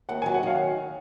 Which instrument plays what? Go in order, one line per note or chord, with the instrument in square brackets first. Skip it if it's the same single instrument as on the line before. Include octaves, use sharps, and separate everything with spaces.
[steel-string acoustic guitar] D#2 [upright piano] F#5
[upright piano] G#5
[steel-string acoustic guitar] F#3
[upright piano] F#5
[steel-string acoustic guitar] D#3 [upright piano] F5